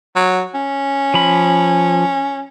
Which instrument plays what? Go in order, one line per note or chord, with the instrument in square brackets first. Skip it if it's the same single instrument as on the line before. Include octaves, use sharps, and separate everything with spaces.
[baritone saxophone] F#3
C#4
[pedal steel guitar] F3 B5